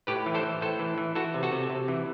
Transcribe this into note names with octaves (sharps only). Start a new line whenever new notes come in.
A2 G4 B4
E3
A4 C5
E3
A2 A4 C5
E3
E3
E3 F#4 A4
C3
F#4 A4
C3
C3
E3